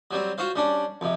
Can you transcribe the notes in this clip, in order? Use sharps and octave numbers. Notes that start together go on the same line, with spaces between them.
F#3 G3 C4
F4 F#4 C5 F5
G3 C#4 D4
F2 C3